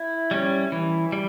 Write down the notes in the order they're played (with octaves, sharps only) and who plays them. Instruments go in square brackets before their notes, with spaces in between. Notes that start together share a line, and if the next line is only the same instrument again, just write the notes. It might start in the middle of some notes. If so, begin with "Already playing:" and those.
Already playing: [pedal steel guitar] E4
G3 C#4
E3
G3